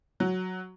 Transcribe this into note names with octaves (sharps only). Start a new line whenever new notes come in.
F#3